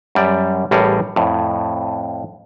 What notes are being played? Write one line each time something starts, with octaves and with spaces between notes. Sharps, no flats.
F#2 G3 D5
A1 A2 G3 G#4 A#4 F#5
F2 A2